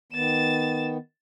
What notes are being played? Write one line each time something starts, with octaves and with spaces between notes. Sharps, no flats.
D#3 B3 A6 E7